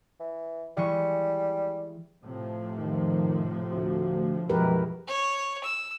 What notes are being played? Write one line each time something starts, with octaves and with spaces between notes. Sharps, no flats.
E3
E3 G3 G#3 C#6
A2 C3 F3
F2 D#3
D2 F#4
F#2 B2 E3 F3 G#3 G4 A#4 B4
C#5
E6